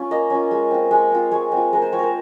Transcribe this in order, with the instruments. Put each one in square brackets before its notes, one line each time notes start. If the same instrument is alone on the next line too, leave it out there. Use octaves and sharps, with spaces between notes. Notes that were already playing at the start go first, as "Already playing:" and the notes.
Already playing: [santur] C#4 F4
A#3 D#5
C#4 F4
G#3
C4 F4
G#3
C4 F4
G#3 C#5
C4 F4
G#3 A#4
C5
C4 F4 C#5
A#4 C5